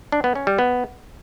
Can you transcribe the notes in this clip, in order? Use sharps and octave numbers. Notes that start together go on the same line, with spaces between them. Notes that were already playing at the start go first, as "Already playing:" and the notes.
D4
B3
C#4
G3
B3